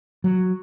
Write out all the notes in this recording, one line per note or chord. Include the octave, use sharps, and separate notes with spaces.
F#3